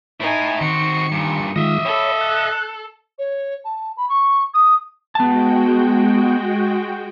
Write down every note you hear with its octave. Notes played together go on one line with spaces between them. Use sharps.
A3 D#4 E4 G#5
D#3 C4 F#4 C#7
G2 A#2
D#3 G#3 F4 D#5 E5
A4 C#5 B5
F#6
C#5
A5
B5
C#6
D#6
G#3 B3 F#4 G5 A5